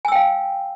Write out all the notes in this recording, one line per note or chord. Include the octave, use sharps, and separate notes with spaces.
F5 G5 G#5 E6